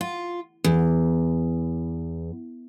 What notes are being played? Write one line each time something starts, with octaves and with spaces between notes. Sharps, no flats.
F4
E2